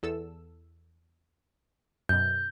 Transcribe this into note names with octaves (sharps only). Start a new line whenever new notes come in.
E2 A4 E6
F#2 B2 G6